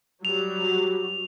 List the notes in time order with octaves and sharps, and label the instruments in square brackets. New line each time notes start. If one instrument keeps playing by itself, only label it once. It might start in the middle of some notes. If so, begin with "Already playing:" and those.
[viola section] F#3 G3 G4 [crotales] F7
[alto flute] F#4